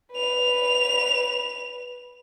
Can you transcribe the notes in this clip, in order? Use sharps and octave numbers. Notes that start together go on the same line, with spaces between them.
B4 F7